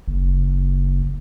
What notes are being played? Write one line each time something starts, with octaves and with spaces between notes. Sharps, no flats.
F#1